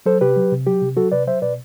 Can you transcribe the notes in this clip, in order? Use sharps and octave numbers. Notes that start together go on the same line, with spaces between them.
F#3 A4 C5
C3 G4 B4
F#3
C3
F#3 G4
C3
F#3 F#4 A4
C3 B4 D5
F#3 C5 E5
B2 B4 D5